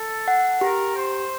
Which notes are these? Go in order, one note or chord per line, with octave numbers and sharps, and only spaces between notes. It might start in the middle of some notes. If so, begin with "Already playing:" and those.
Already playing: A4
F#5
G4 A#4
C5